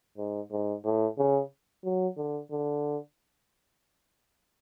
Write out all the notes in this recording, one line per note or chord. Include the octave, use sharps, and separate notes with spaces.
G#2
G#2
A2
C#3
F#3
D3
D3